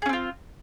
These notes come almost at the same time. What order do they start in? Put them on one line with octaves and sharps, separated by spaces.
G#4 C#4 C4 F4